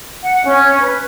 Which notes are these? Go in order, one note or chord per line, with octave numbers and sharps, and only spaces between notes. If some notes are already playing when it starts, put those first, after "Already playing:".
F#5
C#4
B4